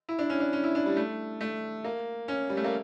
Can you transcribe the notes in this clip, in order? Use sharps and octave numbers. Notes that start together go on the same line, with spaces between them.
E4
D4
C#4
D4
C#4
E4
D4
G3
A3
A3
A#3
C#4
G3
A3
A#3